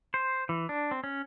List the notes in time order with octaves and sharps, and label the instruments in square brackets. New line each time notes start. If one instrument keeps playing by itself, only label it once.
[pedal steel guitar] C5
E3
D4
C4
C#4